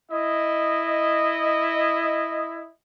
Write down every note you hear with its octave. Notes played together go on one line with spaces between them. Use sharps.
E4 D#5